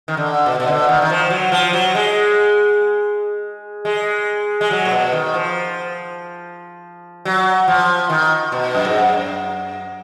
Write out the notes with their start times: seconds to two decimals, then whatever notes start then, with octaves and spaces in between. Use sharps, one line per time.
0.08 D#3
0.17 D3
0.46 B2
0.60 B2
0.67 D3
0.88 D#3
1.02 D#3
1.10 F3
1.30 F#3
1.52 F3
1.73 F#3
1.95 G#3
3.85 G#3
4.61 G#3
4.71 F#3
4.85 A#2
4.91 B2
5.12 D#3
5.34 F3
7.25 F#3
7.68 F3
8.10 D#3
8.52 B2
8.75 F#2
8.85 G#2
8.96 F#2